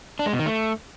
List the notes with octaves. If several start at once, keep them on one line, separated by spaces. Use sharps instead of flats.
D4
G#3
B2
D#3
A3